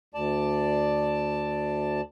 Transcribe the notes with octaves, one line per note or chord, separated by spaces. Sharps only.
D2 D5 A5